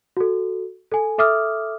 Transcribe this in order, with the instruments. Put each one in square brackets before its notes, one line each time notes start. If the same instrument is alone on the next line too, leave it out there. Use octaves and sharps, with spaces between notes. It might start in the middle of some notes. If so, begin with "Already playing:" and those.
[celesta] F#4 A4
A4 G#5
A4 E5 D6 D#6 F6